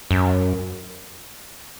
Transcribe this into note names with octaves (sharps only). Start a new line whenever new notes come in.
F#2